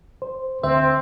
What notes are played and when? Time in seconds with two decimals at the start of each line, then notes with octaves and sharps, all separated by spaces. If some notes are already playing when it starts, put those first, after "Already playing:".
0.22 C5
0.63 D2 C4 C5 E5